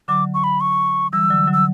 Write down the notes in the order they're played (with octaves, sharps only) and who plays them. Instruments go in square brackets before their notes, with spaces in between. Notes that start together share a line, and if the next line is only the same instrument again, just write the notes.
[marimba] D3 F#3 [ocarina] D6
[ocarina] C#6
B5
C#6
[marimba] E3 G3 [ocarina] E6
[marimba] D3 F#3
D3 F#3
[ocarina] E6